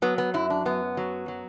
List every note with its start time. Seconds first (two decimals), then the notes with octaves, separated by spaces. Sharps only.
0.02 F#3 B3
0.18 B3
0.34 F#2 E4
0.50 D4
0.65 F#2 B3
0.97 F#3
1.28 F#3